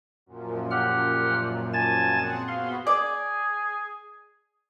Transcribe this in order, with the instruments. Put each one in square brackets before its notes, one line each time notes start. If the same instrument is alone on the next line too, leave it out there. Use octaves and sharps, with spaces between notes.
[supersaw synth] F#2 A#2 F3
[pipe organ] G4 F#5 F6
G#5 A5 A6
[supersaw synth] C4 G#4 F#5
[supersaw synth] B3 F#4 [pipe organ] F5 C6
[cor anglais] G#4 [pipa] D5